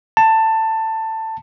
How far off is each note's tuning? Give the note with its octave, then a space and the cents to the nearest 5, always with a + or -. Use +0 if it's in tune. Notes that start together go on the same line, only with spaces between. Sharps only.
A5 +15